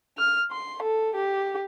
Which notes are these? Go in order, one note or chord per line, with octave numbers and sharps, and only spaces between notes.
F6
C6
A4
G4